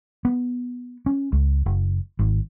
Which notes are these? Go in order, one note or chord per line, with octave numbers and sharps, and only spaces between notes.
B3
C#4
C#2
F#1
G#1